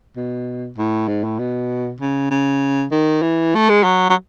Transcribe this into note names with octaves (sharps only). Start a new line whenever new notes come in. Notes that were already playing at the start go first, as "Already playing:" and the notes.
B2
A2
G#2
A2
B2
C#3
C#3
D#3
E3
A3
G#3
F#3
F#3